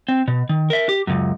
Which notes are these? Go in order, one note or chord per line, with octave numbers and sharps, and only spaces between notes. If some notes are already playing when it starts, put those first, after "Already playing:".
C4
B2
D#3
A#4 E5
G4
C#2 F#2